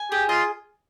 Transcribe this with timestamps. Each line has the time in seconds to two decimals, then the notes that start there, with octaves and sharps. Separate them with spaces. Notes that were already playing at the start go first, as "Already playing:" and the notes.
Already playing: G#5
0.11 G4 G#4
0.29 F4 D#5